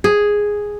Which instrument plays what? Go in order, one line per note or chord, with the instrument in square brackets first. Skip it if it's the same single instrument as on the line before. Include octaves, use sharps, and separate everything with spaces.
[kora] G#4